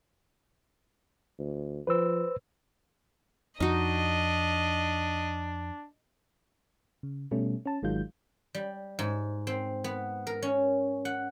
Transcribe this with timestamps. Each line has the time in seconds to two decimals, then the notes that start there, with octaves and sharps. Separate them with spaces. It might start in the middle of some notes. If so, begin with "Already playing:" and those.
1.39 D2
1.87 F3 B4 C5 E6
3.60 F2 D4 D#4 F#4 D#5
7.03 C#3
7.31 B2 G3 A3 C#4
7.66 C#4 A5
7.83 G#1 D#3 F#3 G#3 F4 G6
8.55 G3
8.99 G#2
9.47 C4
9.84 B3
10.27 A#4
10.42 C#4
11.05 F#5